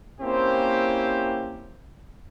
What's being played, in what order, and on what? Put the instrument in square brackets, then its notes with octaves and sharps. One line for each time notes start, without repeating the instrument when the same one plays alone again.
[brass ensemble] A#3 C4 C#4 E4 G4 C5